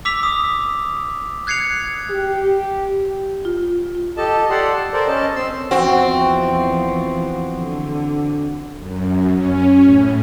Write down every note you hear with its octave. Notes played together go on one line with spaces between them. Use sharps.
D6 E6 B6 F7
D#6
F#6 G#6 C7 C#7 F7
G4
F4
F4
G4 A4 D#5 A5
G4 A4 D5 F#5 C6
A5
A4 A#4 C5 D5
C#4 D#5 A5
C4 C6 E6
E2 F3 C4 F#4
D3
F#2
C#4
A2